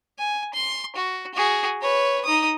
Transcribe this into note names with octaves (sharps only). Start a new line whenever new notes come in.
G#5
C6
F#4
F#4 G#4
B4 C#5
D#4 D#6